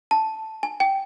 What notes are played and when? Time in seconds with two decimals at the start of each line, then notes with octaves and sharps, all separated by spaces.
0.11 A5
0.63 G#5
0.80 G5